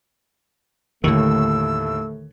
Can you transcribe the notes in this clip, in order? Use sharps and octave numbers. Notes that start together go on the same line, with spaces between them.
D#2 A2 D3 D#3 A3 E6